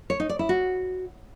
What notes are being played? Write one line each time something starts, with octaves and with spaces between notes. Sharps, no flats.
C#5
D#4
D5
E4
F#4